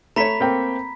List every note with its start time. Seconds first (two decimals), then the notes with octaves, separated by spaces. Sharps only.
0.16 A3 C#5 A#5 B5 B6
0.40 A#3 C4 G5